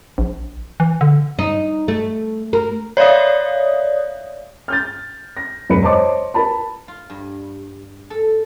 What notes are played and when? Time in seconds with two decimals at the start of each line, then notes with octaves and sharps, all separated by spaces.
0.18 A#1
0.80 E3
1.01 D3
1.39 D#4
1.88 A3
2.53 A#4
2.97 C#5 D5 E5 F5 D#6
4.68 F6 G6 A6
5.37 A#6
5.69 E1 F#2 B4 B5 C#7
5.83 C5 C#5 D#5 A5 C6 D6
6.34 A#4 B4 A5 B5
6.88 F4
7.10 G2
8.10 A4